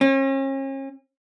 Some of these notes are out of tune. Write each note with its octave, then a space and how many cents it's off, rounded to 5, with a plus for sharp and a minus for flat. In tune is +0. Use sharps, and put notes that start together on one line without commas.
C#4 -40